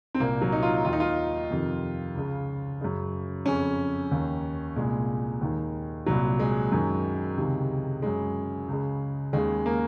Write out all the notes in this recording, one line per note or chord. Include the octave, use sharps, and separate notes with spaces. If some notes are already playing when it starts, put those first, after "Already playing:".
C4
C2 A#2 A#3
F#3
D#4
F4
D#2 D#3 F4
D#4
F4
F2 C3 D#3
C#2 C#3
F#2 C#3
F2 C#3 C#4
D#2 D#3
C2 A#2 G#3
D#2 D#3
C2 A#2 F#3
G#3
F#2 D#3
C#2 C3 D#3
F#2 C#3 G#3
C#2 C#3
D#2 C#3 G#3
A#3